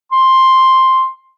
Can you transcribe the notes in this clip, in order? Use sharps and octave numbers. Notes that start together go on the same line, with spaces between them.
C6